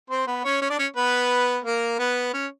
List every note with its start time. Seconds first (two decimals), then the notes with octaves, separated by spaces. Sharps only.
0.10 C4 C5
0.27 B3 B4
0.45 C#4 C#5
0.62 C#4 C#5
0.70 D4 D5
0.79 C#4 C#5
0.96 B3 B4
1.64 A#3 A#4
1.99 B3 B4
2.33 C#4 C#5